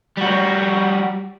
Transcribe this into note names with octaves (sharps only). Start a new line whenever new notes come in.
G3 F#4